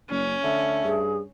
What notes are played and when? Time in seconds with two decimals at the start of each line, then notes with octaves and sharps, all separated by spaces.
0.10 F#1 C#4
0.44 D3 A3
0.84 G2 G#4